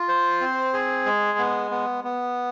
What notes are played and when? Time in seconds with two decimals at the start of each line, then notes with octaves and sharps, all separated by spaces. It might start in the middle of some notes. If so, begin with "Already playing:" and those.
Already playing: F4
0.08 C5
0.41 C4
0.74 G#4
1.06 G#3
1.38 B3
1.71 B3
2.04 B3